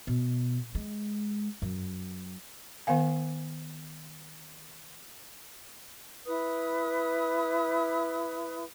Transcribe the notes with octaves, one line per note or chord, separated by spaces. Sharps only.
B2
G#3
F#2
D#3 B3 A#4 F5 G#5
E4 B4 D#6